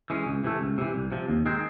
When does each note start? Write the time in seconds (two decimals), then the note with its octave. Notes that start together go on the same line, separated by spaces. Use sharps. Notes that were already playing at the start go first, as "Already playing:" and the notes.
0.10 E3 G#3 C#4
0.26 C#2
0.44 C3 E3 A3
0.61 C#2
0.78 C3 E3
0.95 C2
1.12 C3 F3
1.28 D#2
1.46 D#3 G#3 C4